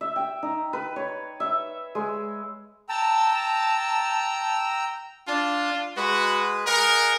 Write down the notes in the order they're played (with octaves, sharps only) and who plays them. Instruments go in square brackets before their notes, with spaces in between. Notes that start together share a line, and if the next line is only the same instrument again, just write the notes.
[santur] E5
G5
D#4
B4
C#5
E5
G#3
[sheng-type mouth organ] G5 A#5 E6 [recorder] A5
[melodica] D4 A5 [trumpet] F4
[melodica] G#3 B4 [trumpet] F#4
[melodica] G#4 D#5 F#5 [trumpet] A#4